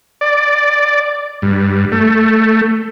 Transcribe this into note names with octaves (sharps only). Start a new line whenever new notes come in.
D5
G2
A3